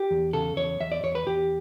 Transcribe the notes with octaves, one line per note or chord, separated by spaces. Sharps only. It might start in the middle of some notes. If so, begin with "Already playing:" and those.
Already playing: G4
E2
C#3 A4
E2 C#5
E2 E5
D5
E2 C#5
B4
E2 G4